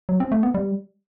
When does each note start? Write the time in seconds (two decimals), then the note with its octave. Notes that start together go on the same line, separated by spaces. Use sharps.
0.09 F#3
0.20 C4
0.32 A3
0.43 B3
0.54 G3